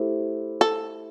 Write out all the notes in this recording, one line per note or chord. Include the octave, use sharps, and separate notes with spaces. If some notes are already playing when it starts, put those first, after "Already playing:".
Already playing: A3 E4 G4 C5
A4